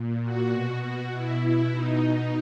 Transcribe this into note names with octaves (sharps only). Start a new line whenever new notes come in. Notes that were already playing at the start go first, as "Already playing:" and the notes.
Already playing: A#2
F#4
B2
F#4
B2 E4
E4
B2 D#4